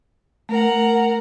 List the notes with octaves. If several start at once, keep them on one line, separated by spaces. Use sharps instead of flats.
A3 A#4 F#5